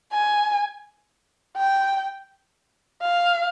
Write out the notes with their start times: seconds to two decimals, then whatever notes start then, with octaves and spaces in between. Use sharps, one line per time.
0.12 G#5
1.57 G5
3.02 F5